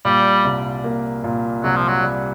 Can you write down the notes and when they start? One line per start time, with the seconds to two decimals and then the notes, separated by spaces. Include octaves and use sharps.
0.05 A#2 G3
0.45 C2
0.84 A#3
1.24 A#2
1.63 C2 F#3
1.76 F3
1.88 F#3
2.04 G3